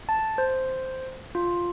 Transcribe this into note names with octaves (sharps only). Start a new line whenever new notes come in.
A5
C5
F4